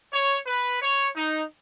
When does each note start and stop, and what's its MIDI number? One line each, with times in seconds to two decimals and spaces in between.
0.13 0.38 73
0.47 0.78 71
0.81 1.08 73
1.16 1.43 63